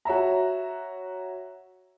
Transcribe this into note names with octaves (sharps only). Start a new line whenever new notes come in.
F#4 C#5 E5 A#5